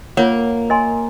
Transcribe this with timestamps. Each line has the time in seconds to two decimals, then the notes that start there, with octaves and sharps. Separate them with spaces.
0.17 A#3 F4 A#4 C#5 F#5
0.70 A#4 D#5 G#5 C6